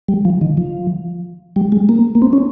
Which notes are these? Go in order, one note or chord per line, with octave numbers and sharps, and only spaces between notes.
G3
F3
D#3
F3
G3
G#3
A#3
A#3
C4
C#4